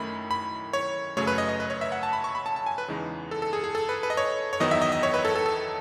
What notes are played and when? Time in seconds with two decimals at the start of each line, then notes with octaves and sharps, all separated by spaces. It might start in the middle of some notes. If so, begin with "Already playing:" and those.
Already playing: F#2 D#3 A3 C#4 E4 B5
0.31 B5
0.73 C#5
1.17 F#2 C#3 F#3 A3 C#5
1.27 B4
1.38 D#5
1.49 D#5
1.60 B4
1.70 C#5
1.81 E5
1.92 F#5
2.03 A5
2.13 B5
2.24 C#6
2.35 B5
2.46 A5
2.56 A5
2.66 G#5
2.78 B4
2.88 E2 C#3 E3 G#3 D#4
3.31 A4
3.42 A4
3.53 G#4
3.64 G#4
3.75 A4
3.89 B4
4.03 B4
4.10 D#5
4.17 C#5
4.53 C#5
4.60 E2 D#3 F#3 B3 D#4 D#5
4.71 E5
4.82 D#5
4.92 D#5
5.03 C#5
5.14 B4
5.25 A4
5.35 A4
5.46 A4